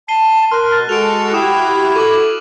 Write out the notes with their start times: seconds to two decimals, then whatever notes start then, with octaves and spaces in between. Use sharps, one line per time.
0.08 A5 C7 D#7 G7
0.51 A#4 C6 F6 F#6
0.72 B2 A5
0.89 G#3 F#4 A4 D7 F7
1.33 E4 G4 D6 D#6 E7
1.96 A4 C#6 D6 F#7